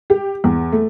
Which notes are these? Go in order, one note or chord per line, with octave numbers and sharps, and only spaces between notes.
G4
E2
A3